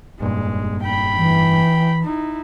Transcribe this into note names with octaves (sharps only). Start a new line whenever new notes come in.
F1 G2 A#2 G#3
G5 B5
E3
D#4 E4